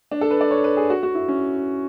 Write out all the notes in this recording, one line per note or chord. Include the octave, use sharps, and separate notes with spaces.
D4
A4
B4
D5
C#5
B4
G#4
F#4
F#4
E4
C#4